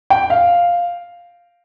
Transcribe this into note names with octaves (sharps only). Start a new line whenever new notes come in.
G5
F5